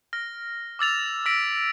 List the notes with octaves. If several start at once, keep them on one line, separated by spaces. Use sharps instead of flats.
F6 A#6
D6 E6 A6 F7
E6 A#6 B6 D7